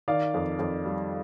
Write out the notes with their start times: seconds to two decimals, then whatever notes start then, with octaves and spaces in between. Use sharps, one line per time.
0.08 D#3 D5 F5
0.34 F2
0.59 F2
0.85 G3